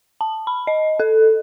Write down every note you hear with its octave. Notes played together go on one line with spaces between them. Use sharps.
A5
B5
D#5
A4